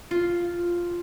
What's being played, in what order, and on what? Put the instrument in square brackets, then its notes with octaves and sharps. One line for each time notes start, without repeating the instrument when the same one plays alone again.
[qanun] F4